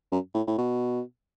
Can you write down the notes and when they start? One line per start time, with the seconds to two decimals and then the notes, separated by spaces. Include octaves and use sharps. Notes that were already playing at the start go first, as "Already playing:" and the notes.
0.12 F#2
0.35 A2
0.47 A2
0.58 B2